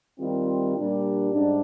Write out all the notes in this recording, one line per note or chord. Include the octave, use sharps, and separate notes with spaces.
D#3 G3 C4 F4
A#2 G3 D4 G4
G#2 G3 D4